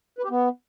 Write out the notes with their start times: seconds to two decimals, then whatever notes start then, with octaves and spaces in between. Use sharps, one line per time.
0.18 B4
0.24 G4
0.30 B3